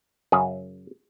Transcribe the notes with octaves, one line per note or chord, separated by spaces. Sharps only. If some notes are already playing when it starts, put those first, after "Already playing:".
F#2 C#3 G#4